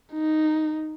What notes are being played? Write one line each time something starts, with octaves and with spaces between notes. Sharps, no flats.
D#4